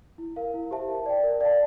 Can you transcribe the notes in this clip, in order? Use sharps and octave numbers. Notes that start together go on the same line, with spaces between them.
E4
A#4 F5
E4
G4 C5 E5 A5
A#4
D5 G5
A#4
D5 F5 A5